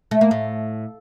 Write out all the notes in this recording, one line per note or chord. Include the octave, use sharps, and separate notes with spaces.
A3
A#3
A2